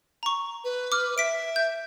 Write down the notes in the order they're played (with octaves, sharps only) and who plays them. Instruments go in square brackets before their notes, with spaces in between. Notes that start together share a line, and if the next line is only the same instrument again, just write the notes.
[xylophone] A#5 C#6
[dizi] B4
[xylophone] D6 F6
[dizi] E5 [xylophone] B6 D7
[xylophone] G6